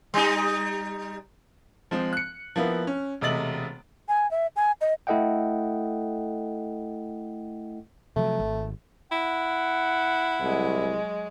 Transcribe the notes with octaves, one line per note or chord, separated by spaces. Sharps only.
G3 D#4
F3 G#3 C4
F#6 C#7
F3 A#3 B3 E4
C#4
E1 C3 A3 D#5 A6 F#7
G#5
E5
G#5
D#5
A3 E4 A4 D#5 F#5 G5
C3 F3 F#3 A3
G#1
E4 F#5
C2 F#3 G#3